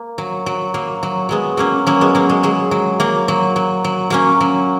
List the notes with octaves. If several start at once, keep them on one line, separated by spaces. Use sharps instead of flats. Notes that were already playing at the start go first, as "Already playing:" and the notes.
Already playing: A#3
F#3
F#3
F#3 A#3
F#3
F#3 G#3 B3
F#3 A#3 C#4
F#3 A#3 C#4
G#3 B3
F#3 A#3
G#3
F#3 G#3
F#3
F#3 A#3
F#3
F#3
F#3
F#3 A#3 C#4
F#3